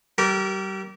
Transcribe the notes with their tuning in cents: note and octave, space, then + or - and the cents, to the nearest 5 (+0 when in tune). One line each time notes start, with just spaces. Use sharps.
G3 -30 A#4 +0